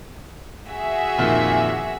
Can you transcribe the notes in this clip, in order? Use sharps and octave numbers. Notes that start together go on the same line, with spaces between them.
F#4 G#4 E5
F2 A#2 D#3